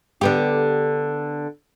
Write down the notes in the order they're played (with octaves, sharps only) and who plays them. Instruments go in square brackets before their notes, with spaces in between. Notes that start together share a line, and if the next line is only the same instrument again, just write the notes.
[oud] D3 B3 G4